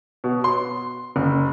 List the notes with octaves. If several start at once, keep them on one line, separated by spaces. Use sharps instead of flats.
B2
C6
F#1